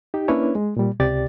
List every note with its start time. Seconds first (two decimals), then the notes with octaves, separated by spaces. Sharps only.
0.14 D#4 G4
0.28 A#3 C#4 D4 E4 B4 C#5
0.55 G#3
0.77 A#2 G3
1.00 C#2 C3 G4 D5 A6